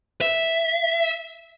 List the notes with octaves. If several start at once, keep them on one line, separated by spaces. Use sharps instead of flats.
E5